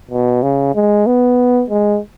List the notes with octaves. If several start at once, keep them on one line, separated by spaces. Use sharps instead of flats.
B2
C#3
G#3
B3
G#3